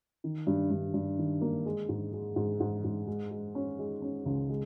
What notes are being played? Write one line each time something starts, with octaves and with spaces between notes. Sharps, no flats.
D#3
G2
G2
G2
D#3
A#3
G#3
G#2
G#3
G#2
G#2
G#2
G#3
G#3
C#4
G#3
C#4
C#2
G#3